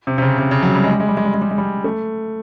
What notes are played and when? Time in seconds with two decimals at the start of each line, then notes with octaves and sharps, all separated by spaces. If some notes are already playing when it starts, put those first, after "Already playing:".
0.07 C3
0.18 C3
0.22 C#3
0.38 C3
0.51 C#3
0.63 F#3
0.75 G3
0.84 G#3
0.92 G3
1.00 G#3
1.08 G3
1.17 G#3
1.25 G3
1.34 G#3
1.42 G3
1.51 G#3
1.58 G3
1.84 A3